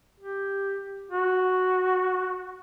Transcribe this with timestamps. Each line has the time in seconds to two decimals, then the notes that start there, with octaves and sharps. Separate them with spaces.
0.20 G4
1.11 F#4